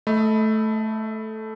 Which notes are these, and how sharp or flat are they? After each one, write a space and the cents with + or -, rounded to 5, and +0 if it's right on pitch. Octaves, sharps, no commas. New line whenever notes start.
A3 -10 D#5 +30 B5 +0